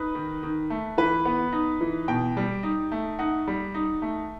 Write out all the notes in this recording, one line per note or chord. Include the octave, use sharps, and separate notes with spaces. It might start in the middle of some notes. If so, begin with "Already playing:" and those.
Already playing: D#4 B4
D#3
D#3
A3
E3 B4
B3
D#4
E3
B2 G5
G3
D#4
A3
D#4 F#5
G3
D#4
A3